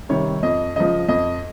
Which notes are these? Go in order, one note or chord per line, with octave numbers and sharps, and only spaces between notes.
C3 D#3 G3 C#5
F2 D#5
C#3 F3 D#5
F2 D#5